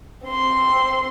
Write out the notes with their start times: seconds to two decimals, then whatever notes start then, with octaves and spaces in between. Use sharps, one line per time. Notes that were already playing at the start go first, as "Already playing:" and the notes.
0.25 C4 C6